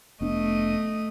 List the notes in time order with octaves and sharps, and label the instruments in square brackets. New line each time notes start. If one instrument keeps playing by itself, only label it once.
[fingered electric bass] F1 B3 D4 [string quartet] A3 D#5